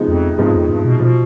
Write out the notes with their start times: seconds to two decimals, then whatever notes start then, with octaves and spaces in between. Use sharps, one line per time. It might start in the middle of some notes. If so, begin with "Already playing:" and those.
Already playing: C3 F3 G#3 B3 D#4
0.08 F2
0.38 G2 C3 F3 G#3 B3 D#4
0.54 F2
0.69 G2
0.85 B2
0.99 B2 F3